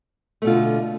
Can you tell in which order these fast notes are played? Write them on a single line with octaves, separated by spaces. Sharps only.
A3 B2 F4 D3